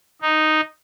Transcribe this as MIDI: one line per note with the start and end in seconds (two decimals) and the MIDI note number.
0.22 0.61 63